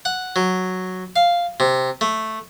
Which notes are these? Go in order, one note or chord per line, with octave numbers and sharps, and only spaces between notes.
F#5
F#3
F5
C3
A3